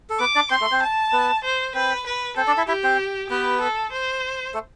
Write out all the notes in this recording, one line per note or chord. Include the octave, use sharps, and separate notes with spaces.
A4
B3 B4 D6
D4 D5
C4 C5 C6
A3 A4
C4 C5
A5
B3 B4
C5
C4 B4 C5
B4
C4 A4 C5
D4 D5
E4 E5
E4 G4 E5
C4 C5
B3 G4 B4
A4
C5
A3 A4